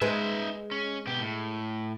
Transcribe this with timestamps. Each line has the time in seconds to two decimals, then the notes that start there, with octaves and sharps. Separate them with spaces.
0.01 G#3 D#4 G#4 B4 E5
0.71 C#4
1.07 B2 G4
1.21 A2